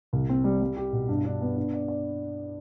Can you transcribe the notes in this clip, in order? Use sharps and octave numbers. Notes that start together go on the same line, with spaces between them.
C2
C4
G3
G3
G4
B2
G2
D4
B3
D4
D5
D5